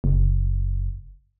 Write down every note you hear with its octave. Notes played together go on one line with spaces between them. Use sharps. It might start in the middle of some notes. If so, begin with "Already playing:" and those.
F#1